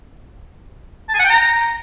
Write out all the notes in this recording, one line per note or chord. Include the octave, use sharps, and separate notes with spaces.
A5
G#5
F#5
G5
A#5